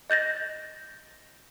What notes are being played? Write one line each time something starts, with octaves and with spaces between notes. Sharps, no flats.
D#5 G6 A6 A#6